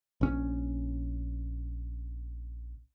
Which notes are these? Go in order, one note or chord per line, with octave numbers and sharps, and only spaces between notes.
A#1 C#4